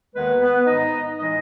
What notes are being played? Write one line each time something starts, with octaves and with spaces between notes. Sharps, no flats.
D#2 D#3 G#3 B3 B4
B3 B4
G#2 D#3 G#3 D#4 D#5
A2 E3 G#3 D#4 D#5